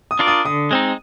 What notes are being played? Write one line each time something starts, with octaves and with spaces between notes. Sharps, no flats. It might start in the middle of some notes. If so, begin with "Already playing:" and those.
D#6
D4 F4 A#4 D5
D#6
D3 D#6
G#3 C4 D#4